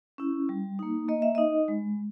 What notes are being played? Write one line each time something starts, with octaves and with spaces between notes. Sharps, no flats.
C#4 E4
G3
A#3 D#4
A#3 D#5
E5
D#4 D#5
G#3